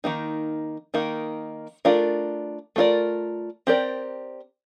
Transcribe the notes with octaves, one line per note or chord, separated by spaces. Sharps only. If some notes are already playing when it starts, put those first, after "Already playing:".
D#3 A#3 D#4
D#3 A#3 D#4
A3 D4 F4 A#4 D5
A3 D4 F4 A#4 D5
C4 G4 A#4 D5